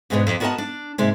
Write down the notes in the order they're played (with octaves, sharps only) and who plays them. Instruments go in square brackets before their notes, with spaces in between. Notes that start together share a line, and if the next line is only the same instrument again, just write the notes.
[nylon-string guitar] G#2 B2 G#3 A3 B3 D4
F2
B3 F#4 A#4 B4 D#5 A5
D4
G#2 C3 G#3 A#3